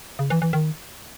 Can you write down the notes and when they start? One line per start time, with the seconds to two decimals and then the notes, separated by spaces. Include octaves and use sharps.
0.19 C#3
0.30 E3
0.42 E3
0.53 D#3